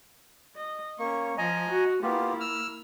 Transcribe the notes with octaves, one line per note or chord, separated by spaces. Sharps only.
D#5
A#3 C#4 C#6
F3 D#5 G#5 A#5
F#4
A#3 B3 E4 F4 G4
E6 F6